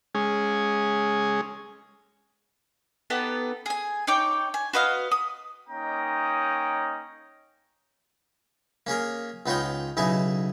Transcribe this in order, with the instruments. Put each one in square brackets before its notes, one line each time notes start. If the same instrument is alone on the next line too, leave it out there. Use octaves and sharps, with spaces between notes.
[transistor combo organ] G#3 C#4 G#4
[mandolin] B3 D#4 G4 A4
G#4 G#5
D#4 C#5 G5 D6
G#5
F#4 B4 D#5 F5
D#6
[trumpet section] A#3 C#4 D#4 D#5 G5 A#5
[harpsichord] A#3 C#4 G#4 A#4
C#2 B3 D#4 F4 C#5 G5
B1 C#3 D#4 E4 G#5